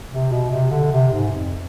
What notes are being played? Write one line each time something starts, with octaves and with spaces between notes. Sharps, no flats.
C3
B2
C3
D3
C3
G#2
F2